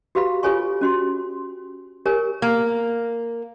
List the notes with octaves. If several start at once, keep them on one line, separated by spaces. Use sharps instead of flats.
F#4 G4 B4 F5 B5
F4 G4 A4 C#5 G#5 C#6
C#4 F#4 C6
G4 A#4 C#5 G#5
A#3